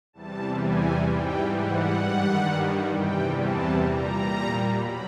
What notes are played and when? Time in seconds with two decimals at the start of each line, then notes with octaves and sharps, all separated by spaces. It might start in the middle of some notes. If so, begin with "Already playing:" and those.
0.13 E2 C3 E3 G3 A5
0.60 G#5
1.05 G#2 E3 G3 G5
1.52 F#5
1.98 G2 D#3 G3
2.91 E2 C3 E3 G3 G5
3.38 A5
3.83 A#2 G3 A#5
4.76 B2 F#3 B5